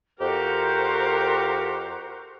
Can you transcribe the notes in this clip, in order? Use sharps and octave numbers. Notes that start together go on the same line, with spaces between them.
F2 F#4 G4 A#4 C5